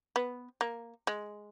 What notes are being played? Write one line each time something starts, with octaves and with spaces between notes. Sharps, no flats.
B3
A#3
G#3